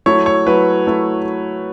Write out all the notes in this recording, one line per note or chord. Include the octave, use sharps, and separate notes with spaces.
F#3 A3 E4 C#5
C#5
F#3 A3 E4 B4
F#3 A3 E4